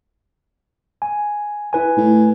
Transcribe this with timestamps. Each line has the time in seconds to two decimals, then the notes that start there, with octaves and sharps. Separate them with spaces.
1.02 G#5
1.73 E4 B4 G#5
1.97 A2